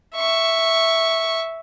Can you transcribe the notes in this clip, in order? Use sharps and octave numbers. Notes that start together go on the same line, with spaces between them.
E5 C#6